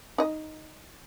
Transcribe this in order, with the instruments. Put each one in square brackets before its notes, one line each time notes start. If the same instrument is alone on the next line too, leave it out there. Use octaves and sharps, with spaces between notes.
[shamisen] D#4 D#5